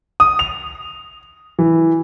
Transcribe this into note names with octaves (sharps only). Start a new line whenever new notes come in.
D#6
F7
E3